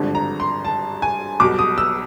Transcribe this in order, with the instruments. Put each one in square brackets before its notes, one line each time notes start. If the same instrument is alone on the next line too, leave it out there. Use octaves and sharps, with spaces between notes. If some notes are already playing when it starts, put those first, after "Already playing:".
Already playing: [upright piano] G#1 G2 D3 F3
A#5
C6
A5
G#5
B1 B2 G3 D6
D#6
E6